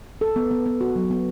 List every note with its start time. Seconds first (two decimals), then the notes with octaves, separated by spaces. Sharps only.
0.21 A4
0.36 B3
0.51 B3
0.66 B3
0.81 F#4
0.96 F#3
1.11 B3